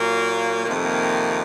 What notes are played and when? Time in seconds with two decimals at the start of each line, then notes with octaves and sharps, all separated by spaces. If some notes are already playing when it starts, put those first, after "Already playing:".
Already playing: A#2 F#3 A#3
0.65 F2 C3 D#3 A#3
0.76 A3
0.85 A#3